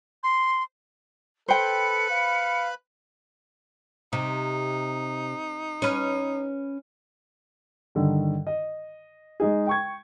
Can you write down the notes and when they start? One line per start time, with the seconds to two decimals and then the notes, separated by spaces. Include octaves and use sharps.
0.24 C6
1.48 A4 B4 C5 G5 B5 C#7
2.10 F5
4.13 C3 D#4
5.82 C#4 B4
7.95 G2 D3 D#3
8.47 D#5
9.40 G#3 D#4 G#4
9.67 G5 C#6 G#6